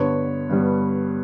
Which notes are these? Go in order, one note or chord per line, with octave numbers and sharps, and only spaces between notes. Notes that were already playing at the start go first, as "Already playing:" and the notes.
Already playing: G2 D3 G3 B3 B4 C#5
G2 D3 G3 B3